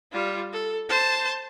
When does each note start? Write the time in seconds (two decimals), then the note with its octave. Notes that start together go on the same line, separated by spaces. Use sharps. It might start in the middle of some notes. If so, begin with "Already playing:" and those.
0.12 G3 F4
0.53 A4
0.89 C5 A5